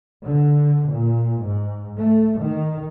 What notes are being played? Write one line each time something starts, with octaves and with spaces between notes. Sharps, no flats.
D3
A#2
G#2
A3
D#3